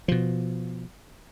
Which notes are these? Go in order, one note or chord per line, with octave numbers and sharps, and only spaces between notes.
B2 F3